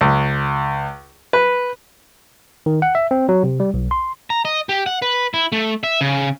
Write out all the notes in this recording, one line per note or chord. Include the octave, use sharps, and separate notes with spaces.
C#2
B4
D#3
F#5
E5
C4
F#3
C3
G3
B1
C6
A#5
D#5
G4
F#5
B4
E4
A3
E5
C#3